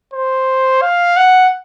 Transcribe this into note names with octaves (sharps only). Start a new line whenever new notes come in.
C5
F5
F#5